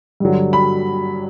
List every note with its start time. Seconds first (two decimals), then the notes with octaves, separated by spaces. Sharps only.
0.20 G2 D3 F#3
0.53 B5